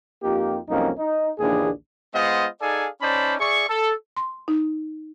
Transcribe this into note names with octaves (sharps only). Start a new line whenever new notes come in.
F2 A#3 D#4 F4 G4
C2 F2 F#3 A#3 C#4 D#4
D#4
A#1 D#2 C#3 E3 D4 G#4
G#3 B3 F4 C5 D#5 F#5
D#4 G#4 A4 D5 F5 G#5
C#4 D#4 C5 D5 A5 B5
G#4 D5 E5 C#6
A4
C6
D#4